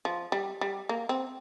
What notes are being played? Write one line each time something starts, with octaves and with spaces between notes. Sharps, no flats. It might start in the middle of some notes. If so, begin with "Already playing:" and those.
F3
G3
G3
A#3
C4